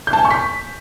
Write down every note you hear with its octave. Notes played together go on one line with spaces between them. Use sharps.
G6
A5
G#5
C#6
B6